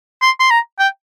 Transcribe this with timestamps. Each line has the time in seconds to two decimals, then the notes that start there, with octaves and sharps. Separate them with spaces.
0.22 C6
0.40 C6
0.51 A#5
0.79 G5